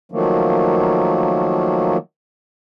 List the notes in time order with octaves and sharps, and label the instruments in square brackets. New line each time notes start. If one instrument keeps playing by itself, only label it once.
[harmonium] D#3 F3 F#3 A3 A#3